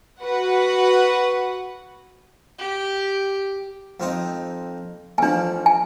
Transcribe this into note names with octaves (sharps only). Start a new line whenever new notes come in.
F#4 B4 F#5
G4
F2 C4 D#4
A1 F3 D4 G#5
G#5